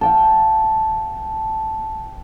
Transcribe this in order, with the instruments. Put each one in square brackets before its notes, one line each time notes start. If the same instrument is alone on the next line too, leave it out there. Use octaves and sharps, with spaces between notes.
[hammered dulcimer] F5 G5 A5